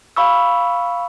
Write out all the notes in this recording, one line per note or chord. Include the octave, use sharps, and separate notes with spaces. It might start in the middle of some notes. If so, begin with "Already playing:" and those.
F5 B5 C#6 E6